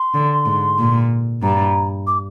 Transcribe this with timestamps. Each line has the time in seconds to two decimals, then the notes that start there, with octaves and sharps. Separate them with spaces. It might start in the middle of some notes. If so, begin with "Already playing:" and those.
Already playing: C6
0.14 D3
0.46 G#2
0.79 A#2
1.43 G2 A#5
2.07 D6